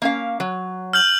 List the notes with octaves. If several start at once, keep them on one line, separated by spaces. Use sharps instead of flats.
A#3 C#4 F5
F#3
F6 G6 F#7